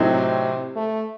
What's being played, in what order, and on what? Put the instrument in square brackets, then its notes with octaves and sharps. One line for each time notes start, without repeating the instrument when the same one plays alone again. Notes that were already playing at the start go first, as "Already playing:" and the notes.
Already playing: [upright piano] A2 F#3 C4 D#4 A4 [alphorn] C3
[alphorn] A3